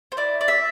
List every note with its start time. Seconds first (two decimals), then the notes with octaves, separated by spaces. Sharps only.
0.12 C5
0.17 E4 D5
0.41 D5
0.48 E5